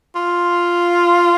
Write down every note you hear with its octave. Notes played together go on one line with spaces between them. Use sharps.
F4